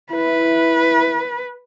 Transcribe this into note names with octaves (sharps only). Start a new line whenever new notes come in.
E4 B4